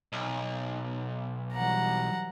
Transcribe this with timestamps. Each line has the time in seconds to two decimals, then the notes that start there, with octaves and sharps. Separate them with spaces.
0.13 B1
1.53 E3 F#3 G3 F#5 A#5